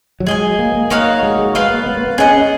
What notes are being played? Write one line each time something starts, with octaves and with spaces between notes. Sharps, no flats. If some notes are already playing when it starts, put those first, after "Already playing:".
F#3
G#3 G#4 D#5 G#5
A#3
A#3
A#3 D#4 F#4 C#5 F5
G#3
G#3
G#3 F4 B4 F5
A#3
B3
A#3
B3
C#4 G#4 D#5 F#5
C#4